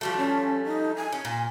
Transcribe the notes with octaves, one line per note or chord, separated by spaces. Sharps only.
F3 G3 A3 F#4
C#4
D#4
G#5
C#4
A#2